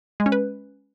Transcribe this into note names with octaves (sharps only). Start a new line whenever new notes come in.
G#3
C#4
B4